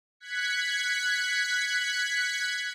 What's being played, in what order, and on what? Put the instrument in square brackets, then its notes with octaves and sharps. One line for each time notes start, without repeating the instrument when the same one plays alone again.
[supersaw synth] F#6 G#6 B6 C#7